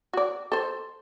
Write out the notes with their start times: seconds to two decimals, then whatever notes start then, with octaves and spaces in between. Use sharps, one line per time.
0.13 F#4 D5
0.52 A4 C5